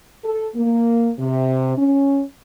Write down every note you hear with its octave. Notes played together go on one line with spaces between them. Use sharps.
A4
A#3
C3
C#4